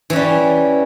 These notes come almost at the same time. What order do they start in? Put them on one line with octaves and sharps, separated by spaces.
E3 C#4 G3